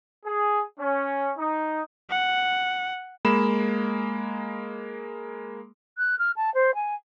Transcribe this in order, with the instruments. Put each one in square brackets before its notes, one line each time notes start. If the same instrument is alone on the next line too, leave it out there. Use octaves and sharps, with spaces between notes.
[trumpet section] G#4
C#4
D#4
[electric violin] F#5
[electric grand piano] G#3 A#3 B5 E7
[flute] F#6
F6
A5
C5
G#5